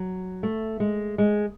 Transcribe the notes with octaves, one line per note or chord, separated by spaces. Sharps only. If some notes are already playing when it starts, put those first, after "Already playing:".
Already playing: F#3
A3
G#3
G#3